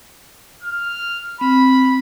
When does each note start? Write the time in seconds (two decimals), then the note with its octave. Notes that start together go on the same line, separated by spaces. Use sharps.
0.63 F6
1.41 C4 B5